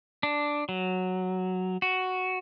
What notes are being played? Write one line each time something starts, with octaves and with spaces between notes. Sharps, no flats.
D4
F#3
F#4